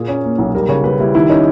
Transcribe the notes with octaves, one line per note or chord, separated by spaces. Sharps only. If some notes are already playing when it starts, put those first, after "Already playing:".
Already playing: A#2 A#3 G#4
C#4
A#3
B1
G3 A#4
C#3 C#5
G3 B4
G3 E4
D#3 E4
C#4 D#4